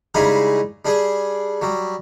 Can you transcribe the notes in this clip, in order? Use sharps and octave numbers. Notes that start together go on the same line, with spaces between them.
C#3 G3 G#3 D#4 E4 G#4
G3 D4 G#4
F#3 G3